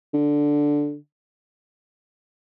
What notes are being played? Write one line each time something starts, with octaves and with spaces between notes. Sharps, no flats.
D3